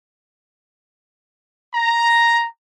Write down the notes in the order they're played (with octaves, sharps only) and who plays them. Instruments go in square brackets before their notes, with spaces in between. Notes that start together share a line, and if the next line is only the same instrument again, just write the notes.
[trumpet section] A#5